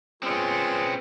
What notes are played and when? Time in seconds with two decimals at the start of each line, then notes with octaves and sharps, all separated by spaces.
0.23 G#3 C4 C#4 F4 B4